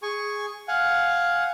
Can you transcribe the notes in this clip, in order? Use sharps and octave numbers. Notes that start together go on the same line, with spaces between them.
G#4 G#5 C#6
F5 F#5 G#5